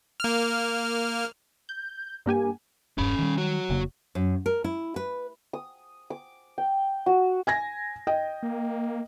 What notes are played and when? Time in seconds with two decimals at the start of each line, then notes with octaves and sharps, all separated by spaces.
0.20 A#3 F6
1.69 G6
2.26 G2 A#3 G4 G#5
2.98 E1 G2 C#4 B5
3.18 D#3 G3
3.38 F#4 C#5
3.70 F1 C#3 A#3
4.15 F#2
4.46 A#4
4.64 E4
4.96 B4
5.53 D#6
6.10 D6
6.58 G5
7.06 F#4
7.47 G#5 G#6 A#6
8.07 D#5 G5
8.43 A#3